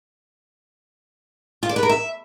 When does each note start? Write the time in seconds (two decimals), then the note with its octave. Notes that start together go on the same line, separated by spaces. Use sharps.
1.63 F4
1.69 D5
1.76 B4
1.83 A#4
1.89 E5